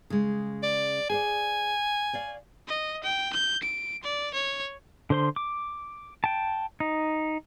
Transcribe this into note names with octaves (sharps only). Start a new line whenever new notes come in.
C#3 G#3
D5
G#4 C5 D5 G#5
C#5 D5 F5
D#5
G5
G6
D7
D5
C#5
D3 C5 C6
D6
G5 A5
D#4